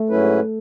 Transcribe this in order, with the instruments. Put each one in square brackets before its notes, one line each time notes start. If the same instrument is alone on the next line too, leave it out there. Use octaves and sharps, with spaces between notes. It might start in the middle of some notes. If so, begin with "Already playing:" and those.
Already playing: [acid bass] A3
[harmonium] G#2 F#3 C#4 E4 B4